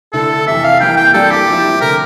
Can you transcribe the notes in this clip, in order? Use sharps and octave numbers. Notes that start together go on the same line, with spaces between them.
D3 A3 E4 A4
F2 C3 E3 E5
F5
C2 C3 E3 A#3 G5
G5
G2 E3 G3 A#3 D4 A4
G4
F3 C4 E4
D3 A3 A#4